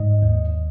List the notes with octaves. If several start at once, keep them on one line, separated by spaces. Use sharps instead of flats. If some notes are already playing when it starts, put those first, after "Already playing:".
Already playing: G#2 D#5
D#2